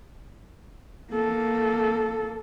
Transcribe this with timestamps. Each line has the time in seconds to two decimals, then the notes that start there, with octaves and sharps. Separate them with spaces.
1.11 A#3 A4